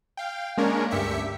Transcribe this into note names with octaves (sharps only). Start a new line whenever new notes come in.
F5 G5
G#3 A#3 C#4 D4 A#4 C#5
D2 G2 G4 E5 B6 C#7